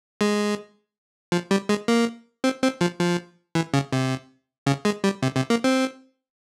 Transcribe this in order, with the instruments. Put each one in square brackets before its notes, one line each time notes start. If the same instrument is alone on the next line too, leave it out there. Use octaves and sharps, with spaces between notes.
[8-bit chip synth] G#3
F3
G3
G#3
A#3
C4
C4
F3
F3
E3
C#3
C3
C#3
G#3
G3
C3
C3
A#3
C4